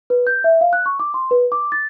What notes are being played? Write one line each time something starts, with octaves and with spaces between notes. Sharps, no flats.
B4
G6
E5
F5
F#6
C#6
D6
C6
B4
D6
A6